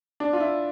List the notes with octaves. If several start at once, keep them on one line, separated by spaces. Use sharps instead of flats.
D4
F4
E4